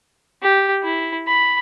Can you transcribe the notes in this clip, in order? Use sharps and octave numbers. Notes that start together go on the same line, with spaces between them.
G4
E4
B5